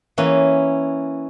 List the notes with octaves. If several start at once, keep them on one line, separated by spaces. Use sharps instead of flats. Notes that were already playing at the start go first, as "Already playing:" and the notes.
E3 A#3 C#4